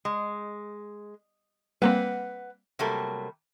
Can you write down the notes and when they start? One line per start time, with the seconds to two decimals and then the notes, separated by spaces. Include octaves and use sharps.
0.05 G#3
1.82 G3 A#3 C4 B4 F#5
2.79 C3 F#3 G3 A3 A#3